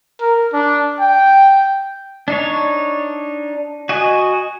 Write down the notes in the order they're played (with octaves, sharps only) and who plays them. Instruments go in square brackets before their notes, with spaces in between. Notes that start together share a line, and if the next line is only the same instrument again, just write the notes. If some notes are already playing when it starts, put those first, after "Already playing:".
[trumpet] A#4
D4
G5
[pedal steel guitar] D4 D#4 C#5
F#4 D#5 G#5